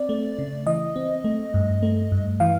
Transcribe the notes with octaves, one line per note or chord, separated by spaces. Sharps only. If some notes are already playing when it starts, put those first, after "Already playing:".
Already playing: C4 D5
A3
C#3
E3 D#5
C4
A3
G2
A3
G2
E3 F5